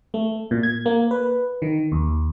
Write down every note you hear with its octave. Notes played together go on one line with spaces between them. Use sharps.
A3
A#2
G#6
A#3
B4
D#3
D#2